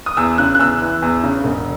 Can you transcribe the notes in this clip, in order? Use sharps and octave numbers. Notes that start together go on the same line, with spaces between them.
D#6
E2 E6
C#3 F#6
F#6
E2 E6
E3
E2
C#3
E1